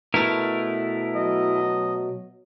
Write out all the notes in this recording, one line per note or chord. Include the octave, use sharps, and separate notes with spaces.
B2 A3 E4 A#4
F#3 D#5